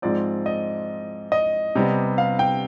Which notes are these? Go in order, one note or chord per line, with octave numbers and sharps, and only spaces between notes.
G#2 F3 C4 D5
D#5
D#5
C3 G3 B3
F5
G5